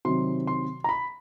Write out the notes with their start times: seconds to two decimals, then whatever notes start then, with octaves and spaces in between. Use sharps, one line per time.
0.05 C3 D#3 F#3 C6
0.47 C6
0.84 A#5
0.89 B5